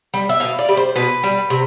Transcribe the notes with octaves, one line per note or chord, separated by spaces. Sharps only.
G3
E5
B2 F5
D5
G3
C5
B2 B4
G3
C3